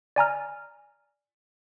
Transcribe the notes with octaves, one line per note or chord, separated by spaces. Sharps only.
D5 G#5 A#5 F6